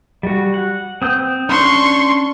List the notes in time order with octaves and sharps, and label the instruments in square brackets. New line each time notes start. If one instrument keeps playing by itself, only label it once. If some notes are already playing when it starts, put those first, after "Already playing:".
[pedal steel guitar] G3 F#4
F#5
C4 D#6 G6
[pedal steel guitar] C#4 D4 [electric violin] C6 C#6